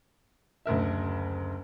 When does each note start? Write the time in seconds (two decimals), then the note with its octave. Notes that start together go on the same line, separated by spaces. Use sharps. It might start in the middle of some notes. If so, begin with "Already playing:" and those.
0.66 F#1 D2 A#4 E5